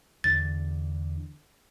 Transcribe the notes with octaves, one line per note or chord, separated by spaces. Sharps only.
E2 D3 A6